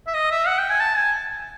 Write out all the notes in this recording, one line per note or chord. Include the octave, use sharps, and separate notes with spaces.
E5
D#5
E5
F#5
G5
G#5
A5
G#5